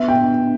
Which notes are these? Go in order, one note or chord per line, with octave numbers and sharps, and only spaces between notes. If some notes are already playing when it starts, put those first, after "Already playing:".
Already playing: B3 E5
G5